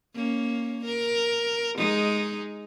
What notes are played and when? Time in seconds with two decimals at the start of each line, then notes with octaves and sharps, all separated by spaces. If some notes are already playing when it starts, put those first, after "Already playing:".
0.14 A#3 C#4
0.85 A#4
1.77 G#3 D#4